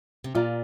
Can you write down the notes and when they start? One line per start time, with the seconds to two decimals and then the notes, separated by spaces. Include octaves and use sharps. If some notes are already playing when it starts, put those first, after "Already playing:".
0.24 C3
0.35 A#2 F4 D5 A#5